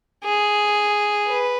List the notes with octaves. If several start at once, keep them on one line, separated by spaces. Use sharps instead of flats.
G#4
B4